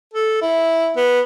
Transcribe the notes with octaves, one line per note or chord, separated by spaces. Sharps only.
A4
E4
B3